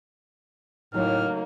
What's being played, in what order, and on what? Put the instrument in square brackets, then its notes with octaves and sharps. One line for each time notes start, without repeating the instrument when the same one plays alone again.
[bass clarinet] A2 [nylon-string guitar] C#3 F#3 A3 [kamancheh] A#3 D#4 [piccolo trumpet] F6